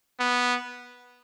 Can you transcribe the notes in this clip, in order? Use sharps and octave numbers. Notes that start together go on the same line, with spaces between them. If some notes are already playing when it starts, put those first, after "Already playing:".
B3